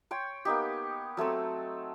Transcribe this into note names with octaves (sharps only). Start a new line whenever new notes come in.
C#5 G5 C6
A#3 B3 D#4 G4
F#3 A3 C4 A4